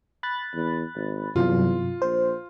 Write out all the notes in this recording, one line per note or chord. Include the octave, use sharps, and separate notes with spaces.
B5 F#6 A6
E2
G#1
E2 G2 C3 F#3 F4
A#1 C5